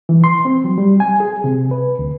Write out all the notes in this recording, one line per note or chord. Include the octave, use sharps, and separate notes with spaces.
E3
C6
C4
F#3
G3
G#5
G#4
C3
B4
D2